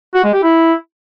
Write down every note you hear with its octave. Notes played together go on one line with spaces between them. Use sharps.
F#4
G#3
G4
E4